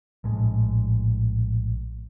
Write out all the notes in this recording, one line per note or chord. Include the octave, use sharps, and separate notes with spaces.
A#1 A2 G#3